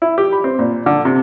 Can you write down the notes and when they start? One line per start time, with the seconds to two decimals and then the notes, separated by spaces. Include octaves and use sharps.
0.02 E4
0.18 G4
0.32 B5
0.44 C4
0.59 A#2
0.86 D3
1.05 C3